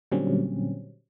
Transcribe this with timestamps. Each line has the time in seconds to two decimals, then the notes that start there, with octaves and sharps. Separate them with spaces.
0.11 A#2 D3 F#3 G3 C4 C#4